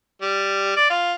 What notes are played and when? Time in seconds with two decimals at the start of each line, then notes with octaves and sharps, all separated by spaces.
0.22 G3
0.77 D5
0.90 F4